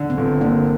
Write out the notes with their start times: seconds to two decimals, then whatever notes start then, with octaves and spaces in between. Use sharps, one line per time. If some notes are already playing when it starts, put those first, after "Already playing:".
Already playing: D3
0.10 C4
0.17 G1
0.41 D3 A#3